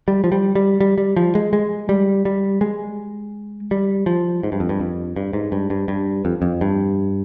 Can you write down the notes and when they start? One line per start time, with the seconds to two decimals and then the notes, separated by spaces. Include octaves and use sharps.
0.08 G3
0.24 F3
0.32 G3
0.55 G3
0.80 G3
0.98 G3
1.16 F3
1.35 G#3
1.53 G#3
1.89 G3
2.25 G3
2.61 G#3
3.71 G3
4.06 F3
4.43 G#2
4.52 G2
4.60 F2
4.69 G2
4.80 F2
5.16 G2
5.33 G#2
5.52 G2
5.70 G2
5.88 G2
6.25 F2
6.42 F2
6.61 G2